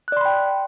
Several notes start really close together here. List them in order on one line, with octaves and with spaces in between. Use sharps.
F#6 D5 C6 B5 G5